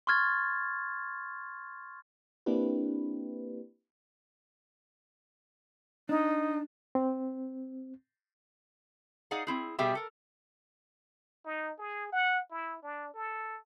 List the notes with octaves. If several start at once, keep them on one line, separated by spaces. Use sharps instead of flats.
C6 C#6 F6 G#6 A6
A#3 C4 D4 E4 G4 B4
D4 D#4
C4
D#4 G#4 D5 F5 F#5
C4 E4 G#4
B2 G3 G4 G#4 E5 G5
A4 A#4
D#4
G#4
F#5
E4
D4
A4